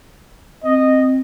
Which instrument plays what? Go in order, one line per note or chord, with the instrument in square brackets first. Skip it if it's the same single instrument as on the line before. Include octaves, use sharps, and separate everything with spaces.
[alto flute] C4 [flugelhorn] D#5